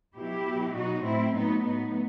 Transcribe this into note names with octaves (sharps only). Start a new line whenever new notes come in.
B2 F#3 E4 G4
B2 F#3
B2 F#3 D#4 F#4
A2 F#3 C4 E4
A2 F#3 B3 D#4
A2 F#3 B3 D#4